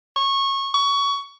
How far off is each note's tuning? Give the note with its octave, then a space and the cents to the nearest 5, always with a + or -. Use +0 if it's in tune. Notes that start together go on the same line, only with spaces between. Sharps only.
C#6 -20
C#6 +20